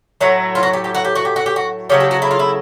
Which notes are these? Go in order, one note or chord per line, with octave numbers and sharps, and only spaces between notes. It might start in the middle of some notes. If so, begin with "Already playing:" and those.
A2 F#3 A3
F4
F#4
G4
G4
F#4
G4
F#4
G4
F#4
G4
F#4
C#3 F#3 A3 G4
G4
F#4
E4
F4
E4